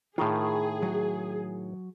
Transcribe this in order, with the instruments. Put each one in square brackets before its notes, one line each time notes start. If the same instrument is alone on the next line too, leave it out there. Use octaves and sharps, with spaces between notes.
[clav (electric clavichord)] A2 D#3 [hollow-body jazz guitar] F4 A#4 F5 [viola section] G#4
[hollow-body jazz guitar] F#3